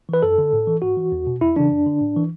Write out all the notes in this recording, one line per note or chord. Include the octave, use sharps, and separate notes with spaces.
E3 B4
F#2 A4
D3
A2
E3
G#2 F#4
E3
E2
B2
E2 E4
C#3 E3 D4
F#2
D3
A2
E3